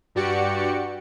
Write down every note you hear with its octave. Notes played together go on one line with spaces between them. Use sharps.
G2 F#4 G4 D5 C#7